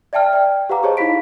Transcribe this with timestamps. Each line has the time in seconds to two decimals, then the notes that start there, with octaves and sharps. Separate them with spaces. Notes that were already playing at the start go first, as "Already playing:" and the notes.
0.13 D5 E5 G5 A5 F6
0.33 D5 G5
0.69 G4 B4 F5 F#5 A#5 D6
0.83 G4 G#4 C5 C#5 D#5 A5
0.97 D#4 E4 F5 B5 B6 D7